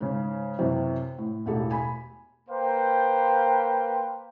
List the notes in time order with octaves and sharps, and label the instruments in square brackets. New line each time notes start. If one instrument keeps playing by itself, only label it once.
[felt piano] G#2 C#3
F#2 C3 E3
A2
E1 A2 E4 G4 A4
G#5 B5
[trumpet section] A#3 B4 C5 F5 G5